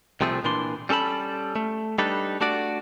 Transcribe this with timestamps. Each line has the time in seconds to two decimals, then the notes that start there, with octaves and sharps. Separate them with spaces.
0.21 C2 C3 F3 A3 G#4
0.44 A#2 E3 D4 C6
0.89 G3 C#4 A4 A5 B5
1.56 A3
1.98 G3 D4 D#4 A4 B4
2.41 A3 D4 F#4 D5